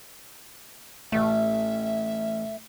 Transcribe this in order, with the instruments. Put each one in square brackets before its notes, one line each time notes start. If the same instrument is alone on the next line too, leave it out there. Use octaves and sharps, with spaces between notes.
[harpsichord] A1 [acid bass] A3 [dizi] E5